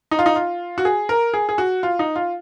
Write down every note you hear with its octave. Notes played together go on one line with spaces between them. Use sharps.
D#4
F4
D#4
F4
F#4
G#4
A#4
G#4
G#4
F#4
F4
D#4
F4